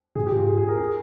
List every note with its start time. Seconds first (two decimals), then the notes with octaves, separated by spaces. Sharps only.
0.15 G#2 G#4
0.27 G4
0.32 G#2 F4
0.47 G#4
0.57 G#4
0.68 A#4
0.78 G#4